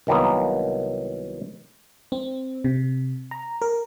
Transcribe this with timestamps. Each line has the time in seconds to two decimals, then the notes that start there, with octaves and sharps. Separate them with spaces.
0.07 C2 D#3 F#3 A#3 B3
2.12 C4
2.64 C3
3.31 A#5
3.62 A#4